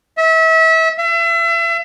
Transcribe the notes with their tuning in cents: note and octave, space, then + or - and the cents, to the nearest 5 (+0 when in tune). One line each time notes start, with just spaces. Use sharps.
E5 -30
E5 +35